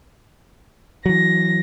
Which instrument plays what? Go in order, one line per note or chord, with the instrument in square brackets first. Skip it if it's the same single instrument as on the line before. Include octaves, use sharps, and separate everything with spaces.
[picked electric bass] E3 F#3 [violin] A#6